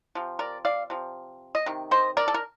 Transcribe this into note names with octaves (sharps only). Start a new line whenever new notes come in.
C3 F3
A#4 D5
D5 F5
C3 F3
D#5
C3 D#3
C5 D#5
A#4 D5
A4
A#4